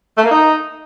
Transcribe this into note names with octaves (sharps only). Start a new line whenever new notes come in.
A3
A#3
D#4